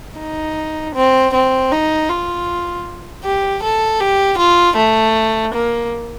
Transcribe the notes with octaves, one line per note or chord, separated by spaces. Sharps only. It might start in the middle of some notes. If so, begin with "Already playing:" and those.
D#4
C4
C4
D#4
F4
G4
A4
G4
F4
A3
A#3